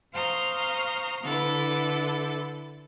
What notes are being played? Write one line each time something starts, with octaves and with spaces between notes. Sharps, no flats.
C5 F5 A#5 C6 C#6 D#6
D3 E4 A4 B4